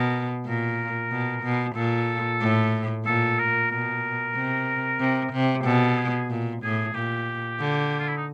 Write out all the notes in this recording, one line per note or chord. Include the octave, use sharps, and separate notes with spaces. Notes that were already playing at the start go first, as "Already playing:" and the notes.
Already playing: B2 A#4
A#2 A#4
B2
B2
A#2 A4
A2
A#2 A4
A#4
B2 A#4
C3
C3
C3
B2 A4
G#4
A#2
A2 G#4
A#2 G4
D3
F4
E4
D#4